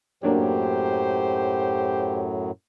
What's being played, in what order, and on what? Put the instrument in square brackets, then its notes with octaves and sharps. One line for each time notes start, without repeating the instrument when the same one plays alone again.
[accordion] F#2 A2 F#3 [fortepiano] A#3 D4 C#5 [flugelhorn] G4 [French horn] C5